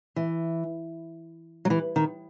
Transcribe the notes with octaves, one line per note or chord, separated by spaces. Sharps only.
E3
F#3
E3
D#3